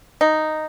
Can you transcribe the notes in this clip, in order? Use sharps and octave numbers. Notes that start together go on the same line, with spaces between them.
D#4